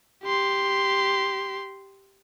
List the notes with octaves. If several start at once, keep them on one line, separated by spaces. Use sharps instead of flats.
G4 C6